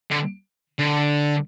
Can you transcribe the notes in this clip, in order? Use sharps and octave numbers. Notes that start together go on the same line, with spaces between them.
D3
D3